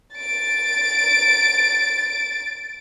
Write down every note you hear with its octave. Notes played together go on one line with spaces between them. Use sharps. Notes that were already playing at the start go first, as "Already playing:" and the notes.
A6 D7